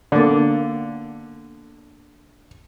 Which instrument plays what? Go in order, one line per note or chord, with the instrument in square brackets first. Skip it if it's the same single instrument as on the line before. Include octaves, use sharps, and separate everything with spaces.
[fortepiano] D3 [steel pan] A#3 B3 D5